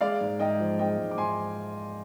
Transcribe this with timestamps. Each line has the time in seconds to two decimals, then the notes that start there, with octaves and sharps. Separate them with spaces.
0.01 G#3 D5 F5
0.21 G#2
0.39 G#2 D#5 G5
0.60 F3
0.79 G#3 D#5 G5
0.99 G#2
1.11 D6
1.18 G#2 G#5 C6